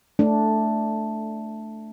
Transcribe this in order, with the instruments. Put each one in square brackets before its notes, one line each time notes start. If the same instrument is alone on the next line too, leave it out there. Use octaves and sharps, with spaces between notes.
[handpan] A3 D4